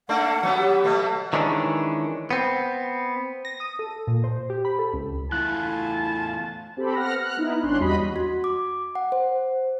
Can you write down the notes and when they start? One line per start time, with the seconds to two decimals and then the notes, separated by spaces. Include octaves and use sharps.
0.09 A3 A#3 D4 F#5
0.43 F#3 B3 C#4
0.58 G4
0.84 B2 A3 B3
1.33 D#3 E3 G#3 C#4 D4
2.31 B3 C4
3.45 A#6
3.60 D#6
3.79 A4
4.07 A#2
4.24 C5
4.50 G4
4.65 B5
4.79 A4
4.93 C#2
5.32 E2 A3 E4 F4 G#5 A5 F#6
6.77 C4 G4 A4 B5
6.94 B3 F#5 F6 F#6 A#6
7.23 F6 F#6
7.37 B3 D#4 E4
7.63 G#1 C#4 D4 C6 F#6
7.80 E2 G3 F#4 D#5 B5 B6
8.16 F#4
8.44 D6
8.95 F#5
9.12 C5